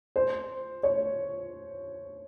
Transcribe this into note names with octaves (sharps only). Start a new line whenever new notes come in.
C5
C#5